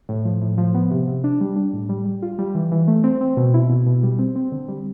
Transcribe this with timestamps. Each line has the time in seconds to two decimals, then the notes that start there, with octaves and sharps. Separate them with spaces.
0.09 A2
0.25 F3
0.42 A2
0.58 F3
0.74 B3
0.91 C3
1.08 C3
1.24 D4
1.41 G3
1.56 D4
1.73 A2
1.89 G3
2.05 G3
2.22 F4
2.38 G3
2.55 E3
2.71 E3
2.88 A3
3.04 C4
3.21 C4
3.37 B2
3.54 E4
3.70 B2
3.86 B2
4.03 G3
4.19 C4
4.36 C4
4.52 D3
4.68 G3